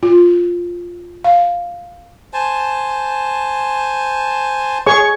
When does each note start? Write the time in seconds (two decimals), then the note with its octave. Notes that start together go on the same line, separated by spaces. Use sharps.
0.03 F4
1.24 F5
2.33 C5 G#5 A5
4.86 G#4 C#5 C#6